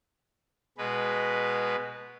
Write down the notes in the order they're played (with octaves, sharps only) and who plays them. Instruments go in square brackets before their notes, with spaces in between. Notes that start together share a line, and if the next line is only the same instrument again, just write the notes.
[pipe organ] B2 G#3 B4